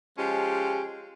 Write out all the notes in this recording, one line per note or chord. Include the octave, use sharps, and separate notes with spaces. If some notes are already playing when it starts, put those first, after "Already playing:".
F3 G#3 C#4 G4